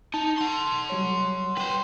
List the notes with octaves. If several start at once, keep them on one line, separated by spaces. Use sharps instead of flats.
D#4 A5
F#5 C6
F#3 G3 C#5
B4 G5 C6